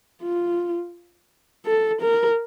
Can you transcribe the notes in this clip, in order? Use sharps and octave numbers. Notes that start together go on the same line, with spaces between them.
F4
A4
A#4